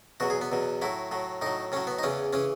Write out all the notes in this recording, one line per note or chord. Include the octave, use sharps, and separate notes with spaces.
E2 B2 F#3 F#4
G#4
B3
E2 B2 F#3
A2 F#3 E4
A2 F#3
A2 F#3 D#4
A2 F#3 C#4
B3
D#4
E2 C#3 E3 C#4
C#3 E3 C#4